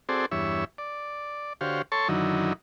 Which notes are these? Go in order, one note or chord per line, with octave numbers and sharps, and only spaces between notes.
C4 F#4 G#4 A4 C5 D5
E2 G2 C#5 E5
D5
D3 F#4 G4 C5 C#5 F5
A4 C#5 A5 C6 C#6
F#2 D3 D#3 F#3 D#4 E4